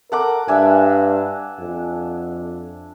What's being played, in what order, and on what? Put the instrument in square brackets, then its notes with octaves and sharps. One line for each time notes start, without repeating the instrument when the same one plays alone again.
[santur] A4 F#5 D6 [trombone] A#4
[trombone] G2 [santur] D4 E5 G#5
[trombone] F2